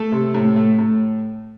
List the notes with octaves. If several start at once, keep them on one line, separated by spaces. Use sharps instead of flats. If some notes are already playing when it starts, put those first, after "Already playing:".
Already playing: A3 A4
C3
A2
A3
A2